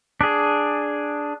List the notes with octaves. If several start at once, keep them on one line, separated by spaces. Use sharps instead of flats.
D4 G#4